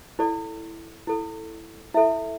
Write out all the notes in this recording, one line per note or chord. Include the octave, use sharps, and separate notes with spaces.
E4 A4 D5
E4 A4
E4 A4 E5